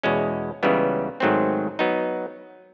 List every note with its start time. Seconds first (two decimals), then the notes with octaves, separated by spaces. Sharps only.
0.03 E2 B2 G#3 C#4
0.63 C#2 C#3 E3 G3 B3
1.20 G#2 D#3 F#3 A3 C4
1.79 F#3 B3 D#4